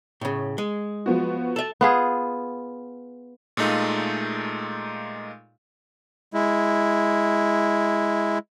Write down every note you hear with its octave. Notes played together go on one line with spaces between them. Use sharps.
A2 C#3
G#3
F3 B3 F#4
A4 E5
B3 F4 G#4
A#2 G#3 A3 D#4 F4
G#3 E4